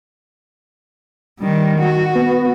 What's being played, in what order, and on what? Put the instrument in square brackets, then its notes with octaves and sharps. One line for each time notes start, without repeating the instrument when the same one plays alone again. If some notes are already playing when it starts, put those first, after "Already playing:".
[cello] D#3 G3
F#4
[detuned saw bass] B3